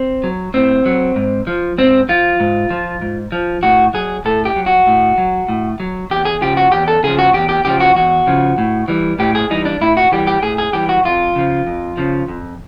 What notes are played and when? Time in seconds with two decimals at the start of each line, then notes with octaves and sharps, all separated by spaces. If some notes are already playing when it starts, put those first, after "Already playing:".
Already playing: C4
0.24 F#3
0.54 A2 C4
0.86 F#3
1.16 G#2
1.47 F3
1.78 G#2 C4
2.09 F3 F4
2.40 G#2
2.70 F3
3.01 G#2
3.32 F3
3.63 A2 F#4
3.94 F#3 G#4
4.25 A2 A4
4.45 G4
4.56 F#3
4.66 F#4
4.87 A2
5.18 F#3
5.49 A2
5.80 F#3
6.10 E2 G4
6.25 G#4
6.41 C#3 F3 G4
6.57 F#4
6.72 E2 G4
6.88 A4
7.03 C#3 F3 G#4
7.19 F#4
7.34 E2 G4
7.49 G4
7.65 C#3 F3 G4
7.80 F#4
7.96 E2 F#4
8.27 C#3 F3
8.58 A2
8.88 E3 G3
9.19 A2 G4
9.35 G#4
9.50 E3 G3 D#4
9.65 D4
9.81 A2 E4
9.97 F#4
10.12 E3 G3 G4
10.27 G4
10.42 A2 G#4
10.58 G#4
10.73 E3 G3 G4
10.89 F#4
11.05 F2 F4
11.36 C#3 F3
11.67 F2
11.97 C#3 F3
12.28 F2